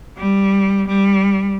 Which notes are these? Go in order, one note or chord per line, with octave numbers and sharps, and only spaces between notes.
G3
G3